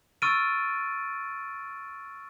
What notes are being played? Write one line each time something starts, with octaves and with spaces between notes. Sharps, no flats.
C#6 E6 F6 A6 D7 D#7